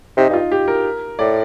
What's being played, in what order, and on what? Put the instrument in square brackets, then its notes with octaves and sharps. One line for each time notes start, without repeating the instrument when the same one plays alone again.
[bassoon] C3 [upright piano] D#4
[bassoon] G2 [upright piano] F4
[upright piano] G4
A#4
[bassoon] A2 [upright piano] D5